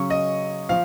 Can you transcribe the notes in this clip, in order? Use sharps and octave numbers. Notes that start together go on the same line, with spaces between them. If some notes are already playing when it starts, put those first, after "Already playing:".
Already playing: C#3 F#3 C#4 C#6
D#5
F3 F5